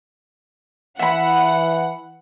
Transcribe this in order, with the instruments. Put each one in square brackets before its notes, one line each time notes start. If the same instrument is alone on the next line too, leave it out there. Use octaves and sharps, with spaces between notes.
[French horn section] E3 [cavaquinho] E5 B5 [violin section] F#5